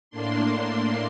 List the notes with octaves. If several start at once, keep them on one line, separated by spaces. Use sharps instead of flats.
A2 A#3 D4 C6